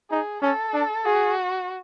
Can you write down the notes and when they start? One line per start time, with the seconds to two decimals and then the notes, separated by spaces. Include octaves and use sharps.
0.10 D#4 G#4
0.42 C#4 A4
0.74 D4
1.05 F#4 G#4